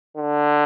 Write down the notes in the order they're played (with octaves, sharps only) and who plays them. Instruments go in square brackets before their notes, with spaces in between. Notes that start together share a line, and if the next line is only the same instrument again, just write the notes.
[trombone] D3